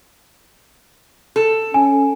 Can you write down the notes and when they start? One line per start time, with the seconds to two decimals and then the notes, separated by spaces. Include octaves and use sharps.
1.36 A4
1.74 C#4 G#5